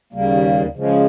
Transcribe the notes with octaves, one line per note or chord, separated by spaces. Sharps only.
D#2 C#3 G3 A#3
C#3 F3 G#3